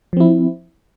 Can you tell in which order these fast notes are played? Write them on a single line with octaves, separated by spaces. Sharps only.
F3 C4 E4